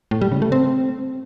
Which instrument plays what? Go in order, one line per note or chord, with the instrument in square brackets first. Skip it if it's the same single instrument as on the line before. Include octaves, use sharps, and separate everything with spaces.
[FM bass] A2
G3
C#3
A3
C4